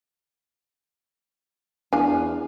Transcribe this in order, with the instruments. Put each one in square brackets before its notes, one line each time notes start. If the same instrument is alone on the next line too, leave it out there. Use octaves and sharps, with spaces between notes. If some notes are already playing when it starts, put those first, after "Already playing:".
[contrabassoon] E2 [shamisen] D4 F5 [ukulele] G#5